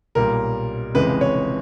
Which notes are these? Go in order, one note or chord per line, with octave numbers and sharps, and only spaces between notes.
B1 A#2 G3 A#4
F1 F2 C#3 E3 G#3 B4
C#5